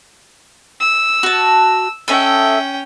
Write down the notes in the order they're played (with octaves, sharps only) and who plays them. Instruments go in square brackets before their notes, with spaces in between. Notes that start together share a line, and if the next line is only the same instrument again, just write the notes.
[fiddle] E6
[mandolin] F#4 A5
[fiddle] C#4 G5 [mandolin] A4 D#5 E5